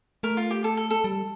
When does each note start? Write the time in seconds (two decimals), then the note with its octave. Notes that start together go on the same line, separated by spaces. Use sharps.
0.23 A3 A#4
0.37 F4
0.51 G4
0.64 A4
0.77 A4
0.90 A4
1.04 G3